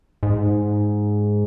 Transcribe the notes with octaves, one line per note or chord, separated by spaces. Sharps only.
G#2